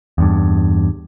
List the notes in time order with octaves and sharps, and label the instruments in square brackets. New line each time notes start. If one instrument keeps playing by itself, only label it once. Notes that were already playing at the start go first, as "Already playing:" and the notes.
[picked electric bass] E2 G2